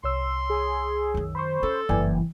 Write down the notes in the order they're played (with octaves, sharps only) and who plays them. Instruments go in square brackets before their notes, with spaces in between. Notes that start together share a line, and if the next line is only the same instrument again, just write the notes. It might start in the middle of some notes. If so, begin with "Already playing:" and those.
[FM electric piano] C2 C#5 E6 [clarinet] C6
[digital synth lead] G#4
[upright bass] F#2 D#3
[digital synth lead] C5 [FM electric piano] B5 C#6
[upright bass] C#4 [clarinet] A4
[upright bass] F#1 G2 [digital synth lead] E3 [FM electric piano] D5 G5 G#5